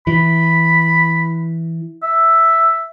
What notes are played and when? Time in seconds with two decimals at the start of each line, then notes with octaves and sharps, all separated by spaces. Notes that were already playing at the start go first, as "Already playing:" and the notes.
0.07 E3 B5
2.03 E5